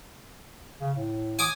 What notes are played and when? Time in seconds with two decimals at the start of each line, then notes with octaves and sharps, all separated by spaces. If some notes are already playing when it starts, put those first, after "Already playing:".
0.81 C#3
0.97 A2
1.39 G#5 D6 D#6